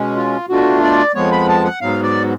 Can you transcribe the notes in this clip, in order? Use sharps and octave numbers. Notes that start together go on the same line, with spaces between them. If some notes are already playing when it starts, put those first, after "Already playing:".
Already playing: B2 G#3 C#4
F4
B2 A3 D4 F4 F#4
D5
F2 F3 G#3 B3 C#5
B5
A5
F#5
G#2 F#3 B3 F5
D5